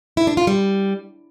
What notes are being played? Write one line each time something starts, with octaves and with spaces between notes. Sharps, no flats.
E4
D4
F4
G3